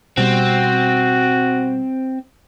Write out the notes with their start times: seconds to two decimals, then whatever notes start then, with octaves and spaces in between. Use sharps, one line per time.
0.18 B2 G3 C4 F#4